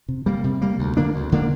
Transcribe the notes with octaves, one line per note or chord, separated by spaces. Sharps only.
C3
G3 A#3
C3
G3 A#3
D2
D3 A#3 D4
D2
D3 A#3 D4